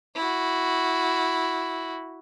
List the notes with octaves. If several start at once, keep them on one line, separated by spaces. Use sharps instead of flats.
E4 F#4